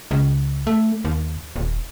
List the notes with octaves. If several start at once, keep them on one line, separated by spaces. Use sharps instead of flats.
C#2
A3
D#2
D#1